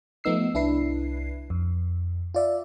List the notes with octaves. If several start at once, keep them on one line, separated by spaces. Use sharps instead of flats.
F3 A3 B3 D#4 E6 C7
C2 D4 E4 B4 C7
F2
F4 D5 E5